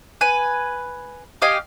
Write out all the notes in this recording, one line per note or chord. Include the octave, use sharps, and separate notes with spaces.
B4 G#5
G4 D#5 F5 G#5